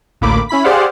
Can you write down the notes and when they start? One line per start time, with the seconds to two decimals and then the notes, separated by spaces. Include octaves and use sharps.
0.21 A1 D2 A2 A#3 B5 D6
0.49 C#4 E4 B5 B6
0.64 G4 G#4 C5 D5 F5 F#5